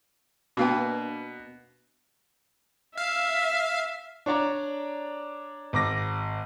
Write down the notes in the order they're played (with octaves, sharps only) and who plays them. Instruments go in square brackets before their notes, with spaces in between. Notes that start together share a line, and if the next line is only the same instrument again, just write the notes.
[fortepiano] B2 [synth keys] A#3 D4 B4 [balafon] F#4 F5 G5
[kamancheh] E5 [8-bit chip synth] F5
[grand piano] D4 C#5 D5 A#5
G#1 D6 A#6